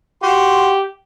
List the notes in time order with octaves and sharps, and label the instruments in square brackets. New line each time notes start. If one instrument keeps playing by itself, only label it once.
[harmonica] F#4 C6 [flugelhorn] G4